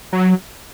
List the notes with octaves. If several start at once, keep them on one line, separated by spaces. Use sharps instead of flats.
F#3